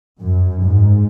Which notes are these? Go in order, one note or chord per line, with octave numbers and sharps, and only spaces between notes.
F#2
G#2